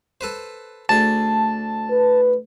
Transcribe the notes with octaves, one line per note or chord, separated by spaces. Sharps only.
A4 B4 C5
D2 G#4 A5
B4